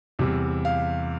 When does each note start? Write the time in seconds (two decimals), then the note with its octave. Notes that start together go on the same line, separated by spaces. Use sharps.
0.19 E2 C3 G3
0.65 F5